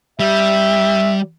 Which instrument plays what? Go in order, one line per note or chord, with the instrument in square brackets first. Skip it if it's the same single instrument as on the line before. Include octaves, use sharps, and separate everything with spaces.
[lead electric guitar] G3 [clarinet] E5